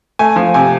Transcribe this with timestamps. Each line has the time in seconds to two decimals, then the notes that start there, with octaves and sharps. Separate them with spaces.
0.19 A3 G#5
0.36 F3
0.54 C3 G#5